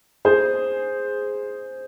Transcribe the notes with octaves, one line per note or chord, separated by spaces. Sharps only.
G#4 C5